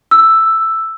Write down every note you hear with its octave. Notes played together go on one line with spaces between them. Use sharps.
E6